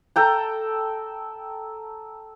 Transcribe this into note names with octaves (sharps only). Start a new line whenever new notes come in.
A4 G5 A#5